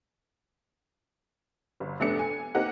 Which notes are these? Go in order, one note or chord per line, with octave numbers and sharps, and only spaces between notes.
G1
F1 A3 B3 D4 C#7
G#5
A#3 C4 D#4 G4 F#5